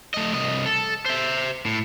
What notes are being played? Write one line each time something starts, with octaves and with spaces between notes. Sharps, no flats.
A3 D#5
C2 D#5
A4
C5 E5
A2